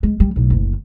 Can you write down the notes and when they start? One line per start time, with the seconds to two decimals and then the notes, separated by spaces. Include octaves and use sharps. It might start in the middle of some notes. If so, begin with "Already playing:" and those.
0.03 G#3
0.20 G3
0.36 B1 A2
0.50 F#1 D2